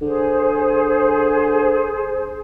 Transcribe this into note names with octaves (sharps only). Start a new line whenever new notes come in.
D3 G#4 C5